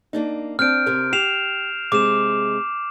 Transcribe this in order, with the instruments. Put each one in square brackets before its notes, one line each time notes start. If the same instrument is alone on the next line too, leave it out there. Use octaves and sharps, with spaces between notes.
[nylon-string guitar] A#3 D4 D#4
[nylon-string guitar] C4 D4 [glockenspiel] F6 G6 D7
[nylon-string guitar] C3 A#4
[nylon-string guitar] G4 [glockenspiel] C7 E7 F7
[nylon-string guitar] C3 G#3 [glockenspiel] D6 E7